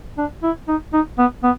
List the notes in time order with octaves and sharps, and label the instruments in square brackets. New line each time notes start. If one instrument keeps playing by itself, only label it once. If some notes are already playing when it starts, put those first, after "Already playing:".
[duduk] D4
E4
D#4
D#4
B3
B3